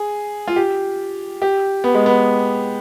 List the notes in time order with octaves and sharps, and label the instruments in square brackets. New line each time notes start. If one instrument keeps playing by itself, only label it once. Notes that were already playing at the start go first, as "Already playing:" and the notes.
Already playing: [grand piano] G#4
F4
G4
G4
B3
G#3
B3